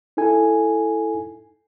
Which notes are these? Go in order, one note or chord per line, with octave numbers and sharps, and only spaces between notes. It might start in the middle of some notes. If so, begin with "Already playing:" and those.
D#4 E4 A4 G#5